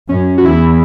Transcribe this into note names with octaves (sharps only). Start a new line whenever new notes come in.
F#2 C#4
F#4
E2 E4